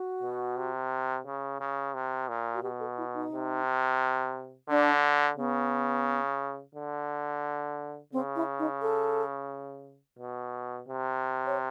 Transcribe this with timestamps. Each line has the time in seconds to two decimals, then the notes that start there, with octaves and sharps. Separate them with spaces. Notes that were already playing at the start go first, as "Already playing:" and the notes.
Already playing: F#4
0.23 B2
0.57 C3
1.26 C#3
1.60 C#3
1.94 C3
2.29 A#2
2.55 F#4
2.63 B2 G4
2.80 A4
2.98 E4
3.14 D#4
3.32 C3
4.69 D3 D4
5.37 C#3 B3
6.75 D3
8.13 C#3 C4
8.36 E4
8.59 D#4
8.82 A4
10.19 B2
10.88 C3
11.46 C#5